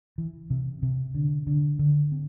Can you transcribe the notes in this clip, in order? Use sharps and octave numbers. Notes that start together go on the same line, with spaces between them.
E3
C3
C3
D3
D3
D3
C4